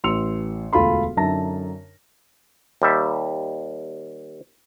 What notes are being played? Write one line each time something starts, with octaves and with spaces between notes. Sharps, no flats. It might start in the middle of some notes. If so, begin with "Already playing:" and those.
A1 C6 E6 C#7 F7
E1 D2 F4 A4 B5 C6
F#2 D3 D#4 E5 A5 A#6
D#2 G3 E5